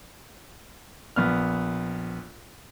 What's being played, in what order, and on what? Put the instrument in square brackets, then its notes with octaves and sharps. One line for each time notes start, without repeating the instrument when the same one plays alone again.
[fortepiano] A#1 B3 F6